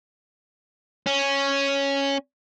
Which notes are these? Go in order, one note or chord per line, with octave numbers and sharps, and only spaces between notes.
C#4